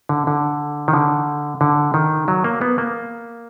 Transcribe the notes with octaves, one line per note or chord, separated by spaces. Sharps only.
D3
D3
D#3
D3
D3
D#3
F#3
A#3
B3
A#3